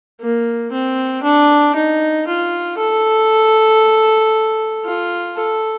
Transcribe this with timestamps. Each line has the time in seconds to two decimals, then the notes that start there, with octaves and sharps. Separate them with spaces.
0.20 A#3
0.72 C4
1.23 D4
1.75 D#4
2.27 F4
2.78 A4
4.85 F4
5.36 A4